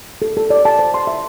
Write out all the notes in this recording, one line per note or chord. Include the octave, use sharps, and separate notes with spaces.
A4
A4
D5
A5
C5
C6
E5